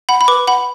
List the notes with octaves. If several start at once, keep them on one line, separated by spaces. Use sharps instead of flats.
F#5 B5
B5
B4 D6
F#5 B5